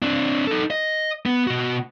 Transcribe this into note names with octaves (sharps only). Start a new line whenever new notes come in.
C4 D4
D#4 A4
D#5
B3
B2 F#4